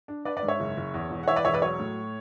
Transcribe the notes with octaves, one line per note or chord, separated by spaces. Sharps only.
D4
D4 B4 D5
B4 D5
G#2
C#5 E5
F#1
F#1
E2
E1
F#5
E3 C#5 E5
B4 D5
E1 C#5 E5
B4 D5
F#3 C#5
A2